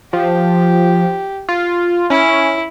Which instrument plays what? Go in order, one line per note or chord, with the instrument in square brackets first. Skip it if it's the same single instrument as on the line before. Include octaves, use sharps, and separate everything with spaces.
[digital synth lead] F3 [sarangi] G4
[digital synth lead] F4
[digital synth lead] C#4 [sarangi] E4